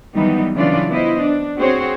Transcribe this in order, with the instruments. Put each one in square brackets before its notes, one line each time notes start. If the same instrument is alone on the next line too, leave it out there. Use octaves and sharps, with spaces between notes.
[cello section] D#3 E3 F#3 G3 B3 D#4
C#3 E3 F#3 D4 F4 D5
B3 E4 C5 D#5
D4
C4 F#4 G#4 C5 C#5